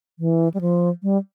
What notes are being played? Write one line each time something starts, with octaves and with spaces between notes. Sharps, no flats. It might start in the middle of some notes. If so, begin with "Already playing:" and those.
E3
G3
F3
G3